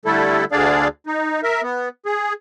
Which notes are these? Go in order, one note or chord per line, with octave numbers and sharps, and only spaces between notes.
D3 G3 A3 E4 A4
D2 D3 D4 G#4 D5 F5
D#4
A#4 E5
B3
G#4